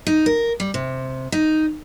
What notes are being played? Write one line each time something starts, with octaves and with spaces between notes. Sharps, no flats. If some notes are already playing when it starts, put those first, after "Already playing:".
D#4
A#4
G3
C3
D#4